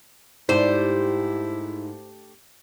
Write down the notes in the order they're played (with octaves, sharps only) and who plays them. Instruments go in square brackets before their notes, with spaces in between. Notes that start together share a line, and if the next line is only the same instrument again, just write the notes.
[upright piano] G#2 [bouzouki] A3 D4 G4 [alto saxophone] E4 [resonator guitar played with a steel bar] C5